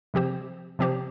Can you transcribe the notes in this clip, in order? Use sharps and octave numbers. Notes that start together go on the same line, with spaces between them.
C3 F3 C4 G4 C5
C3 F3 C4 G4 C5